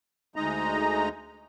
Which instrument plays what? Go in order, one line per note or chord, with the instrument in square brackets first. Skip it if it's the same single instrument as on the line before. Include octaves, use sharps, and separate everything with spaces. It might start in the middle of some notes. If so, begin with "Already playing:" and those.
[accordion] D2 G#3 D#4 D#5 A#5